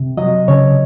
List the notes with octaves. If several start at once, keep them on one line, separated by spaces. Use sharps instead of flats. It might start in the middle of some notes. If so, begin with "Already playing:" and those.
Already playing: C3
F#3 D#5
C#3 C#5